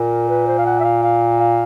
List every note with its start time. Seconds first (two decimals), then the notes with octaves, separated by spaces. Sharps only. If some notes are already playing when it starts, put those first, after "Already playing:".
Already playing: A#2 A#4
0.29 B4
0.47 C5
0.58 F5
0.66 F#5
0.80 E5
0.84 F5
1.03 F5
1.40 F5